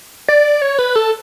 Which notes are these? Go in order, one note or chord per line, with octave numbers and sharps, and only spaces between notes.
D5
C#5
B4
A4